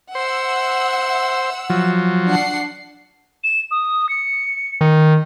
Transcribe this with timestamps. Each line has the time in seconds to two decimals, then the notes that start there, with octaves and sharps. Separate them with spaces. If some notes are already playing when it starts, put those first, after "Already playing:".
0.15 C5 E5 F#5 E6
1.70 F3 F#3
2.25 D4 F#5 C7
3.44 E7
3.71 D#6
4.09 C#7
4.81 D#3